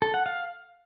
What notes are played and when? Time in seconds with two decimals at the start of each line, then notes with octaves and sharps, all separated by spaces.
0.02 A4
0.14 F#5
0.26 F5